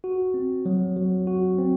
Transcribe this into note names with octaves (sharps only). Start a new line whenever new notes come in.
F#4
C4
F#3
F#3
F#4
C4